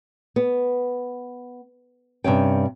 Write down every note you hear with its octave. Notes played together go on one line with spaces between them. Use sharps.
B3
G2 C3 C#4 G5